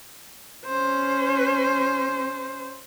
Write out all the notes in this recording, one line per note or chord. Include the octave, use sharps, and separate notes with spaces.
C#4 C5